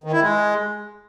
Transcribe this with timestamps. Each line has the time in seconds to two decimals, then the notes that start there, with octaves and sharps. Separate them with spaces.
0.04 D#3
0.12 E4
0.21 G#3